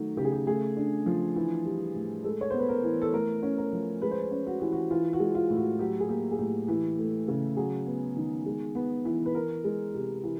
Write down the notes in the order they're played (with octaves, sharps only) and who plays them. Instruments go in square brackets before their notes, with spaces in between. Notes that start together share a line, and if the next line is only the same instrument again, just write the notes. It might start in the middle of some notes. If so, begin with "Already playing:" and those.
Already playing: [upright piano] D#3 F#3 A3 F#4
C#3 G4
G#4
G4
A3 G#4
D4
F3
E3
G3
A2
G#3 A4
C#5
B3 C5
B4
A#4
E3
A4
A3 A#4
C#4
A#4
F3
G#3 B4
C5
B4
C#4
F#4
E3 G4
F#4
E3 F4
F#4
G#3
F4
A2
F#4
F#3 G4
G#4
A#3 G4
G#4
A2 G4
E3
A3
C#3
F#3 G#4
B3
D#3
G#3
B3
E3
B4
E3 A#4
G#3
C3
E3